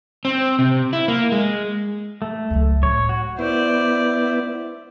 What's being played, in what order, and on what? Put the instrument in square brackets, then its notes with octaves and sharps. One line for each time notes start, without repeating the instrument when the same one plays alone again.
[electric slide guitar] C4
C3
E4
A#3
G#3
[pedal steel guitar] A3
[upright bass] C#2 F#3
[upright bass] A2 [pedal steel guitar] C#5
[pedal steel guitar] F#4
[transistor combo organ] B3 E4 [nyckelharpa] C5 D5